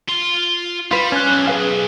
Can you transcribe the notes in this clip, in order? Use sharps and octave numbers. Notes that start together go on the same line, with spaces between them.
F4 C6
G3 F4 B4
C#4 F#6
B1
G#4 B4 F5